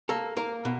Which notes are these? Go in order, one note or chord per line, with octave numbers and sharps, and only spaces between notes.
A#3 A4
A#3 A#4
B2